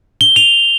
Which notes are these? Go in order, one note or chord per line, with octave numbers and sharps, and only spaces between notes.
G7
F7